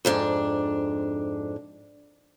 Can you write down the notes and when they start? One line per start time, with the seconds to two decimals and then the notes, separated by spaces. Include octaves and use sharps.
0.05 F2 G#2 D4